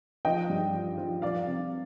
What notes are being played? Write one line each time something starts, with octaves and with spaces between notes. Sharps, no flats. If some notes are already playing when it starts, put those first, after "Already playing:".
F3 D#5 G5
G2
F3
F3
F3 D5 F5
C3